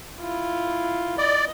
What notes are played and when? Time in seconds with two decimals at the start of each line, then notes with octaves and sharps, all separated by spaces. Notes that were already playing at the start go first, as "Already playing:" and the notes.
0.20 E4 F4
1.18 D5 D#5